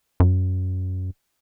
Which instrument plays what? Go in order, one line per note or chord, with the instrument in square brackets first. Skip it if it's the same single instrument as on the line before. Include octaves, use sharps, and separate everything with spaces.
[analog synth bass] F#2